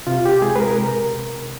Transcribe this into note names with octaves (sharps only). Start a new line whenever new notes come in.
C3 F4
G4
G#3 G#4
B4
A#4
C3 A#4